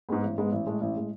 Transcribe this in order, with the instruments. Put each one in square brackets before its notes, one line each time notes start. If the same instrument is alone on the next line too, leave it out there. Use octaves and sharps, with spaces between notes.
[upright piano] G#2 G#3 B3
A1
G#2 G#3 B3
A1
A2 G#3
A1
A2 G#3